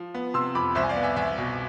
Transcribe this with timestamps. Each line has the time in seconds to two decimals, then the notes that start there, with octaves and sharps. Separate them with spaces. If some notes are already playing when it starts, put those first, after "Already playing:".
Already playing: F3
0.14 B3
0.34 C3 C6 E6
0.55 F2 B5 D6
0.75 C2 C5 E5
0.83 G#5
0.89 D5 F5
0.96 B3
1.03 E5 G#5
1.16 C2 E5 G#5
1.38 B2